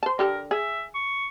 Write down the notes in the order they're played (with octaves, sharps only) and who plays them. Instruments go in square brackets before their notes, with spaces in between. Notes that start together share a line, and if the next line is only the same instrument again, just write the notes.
[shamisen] C5 A5
[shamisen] D3 G4 A4 [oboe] A#4
[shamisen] G#4 [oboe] E5
[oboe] C#6